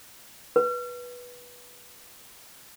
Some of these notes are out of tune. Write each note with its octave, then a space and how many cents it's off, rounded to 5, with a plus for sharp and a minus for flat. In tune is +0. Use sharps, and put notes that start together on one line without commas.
B4 -15